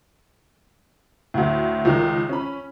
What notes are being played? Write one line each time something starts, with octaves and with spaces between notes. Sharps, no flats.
D2 A2
C#2 D#3
C#4 B5